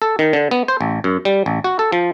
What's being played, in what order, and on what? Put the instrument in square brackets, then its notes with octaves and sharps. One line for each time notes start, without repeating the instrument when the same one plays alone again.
[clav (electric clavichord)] A4
D#3
D3
B3
C5
A1
F#2
G3
A1
F#4
A4
F3